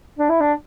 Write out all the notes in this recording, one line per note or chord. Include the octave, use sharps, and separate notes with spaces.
D4
E4
D4